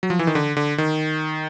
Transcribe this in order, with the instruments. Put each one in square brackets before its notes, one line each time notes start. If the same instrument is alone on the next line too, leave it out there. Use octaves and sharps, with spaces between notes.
[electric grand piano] F#3
F3
E3
D#3
D3
D3
D#3